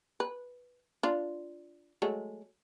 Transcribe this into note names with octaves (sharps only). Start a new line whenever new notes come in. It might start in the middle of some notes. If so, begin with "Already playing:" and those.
B4
D4 F4
F#3 G#3 A3